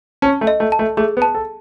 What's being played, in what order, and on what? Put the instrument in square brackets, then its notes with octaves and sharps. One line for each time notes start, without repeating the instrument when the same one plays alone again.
[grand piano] C#4 [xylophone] A5
[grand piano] A3
[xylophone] D#5
[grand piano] A3
[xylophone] A5
[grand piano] A3
[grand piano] A3 [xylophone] G#4
[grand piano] B3
[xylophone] A5
[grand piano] A4